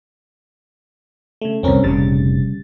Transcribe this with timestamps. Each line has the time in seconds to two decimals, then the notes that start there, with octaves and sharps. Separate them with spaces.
1.41 C#3 A3
1.63 C2 F2 C4 C#4 A#4
1.83 F1 A#2 C#3 G3 A6